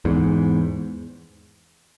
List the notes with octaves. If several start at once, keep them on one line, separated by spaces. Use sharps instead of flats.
E2 G#2